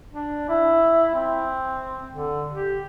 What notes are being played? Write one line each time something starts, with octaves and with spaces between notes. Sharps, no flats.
D4
E4
C4
D3
G4